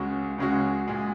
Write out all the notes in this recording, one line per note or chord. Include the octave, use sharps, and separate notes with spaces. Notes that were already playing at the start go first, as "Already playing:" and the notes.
Already playing: C#2 C#3 G#3 C#4 F#4
C#2 C#3 G#3 C#4 F#4
A#2 G#3